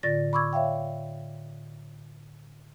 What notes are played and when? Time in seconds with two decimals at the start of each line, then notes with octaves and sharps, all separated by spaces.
0.03 A2 D3 F4 D5 A6 A#6
0.33 B5 C#6 D6 E6 G#6
0.53 C#5 E5 F5 G5